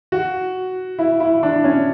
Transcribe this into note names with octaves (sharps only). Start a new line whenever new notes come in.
F#4
E4
E4
D4
C#4